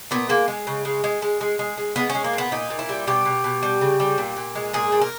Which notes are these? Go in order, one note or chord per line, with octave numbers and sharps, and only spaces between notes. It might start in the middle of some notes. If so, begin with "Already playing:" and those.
A#2 B3
G#3 A#3
G#3
C#3
G#3
G#3
G#3
G#3
G#3
G#3
G#3 B3
C#4
G#3
A#3
A#2 B3
A#2 D#4
A#2
E4
G3
B2 G4
B2
B2
G3
C#3
G3
A#2
A#2
G#3
A#2 G#4
A#2
A#4